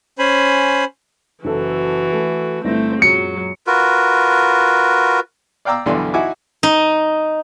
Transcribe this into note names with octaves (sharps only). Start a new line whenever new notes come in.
C#4 C5 G#5 B5
F#1 E3 F#4 A4
A3 A4
G1 A3 C4 E4 A#6
F#2 A#2 F#3 G#3 C#7
F4 F#4 A#4 B4
D5 F5 G5 A#5 D6 E6
B1 G2 D3 E3 D5 C6
D#4 E4 F#4 G#5 D6
D#4